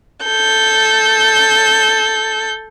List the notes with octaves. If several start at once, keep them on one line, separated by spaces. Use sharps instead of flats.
A4 G6